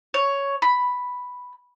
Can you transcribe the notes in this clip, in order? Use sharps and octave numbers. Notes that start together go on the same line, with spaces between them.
C#5
B5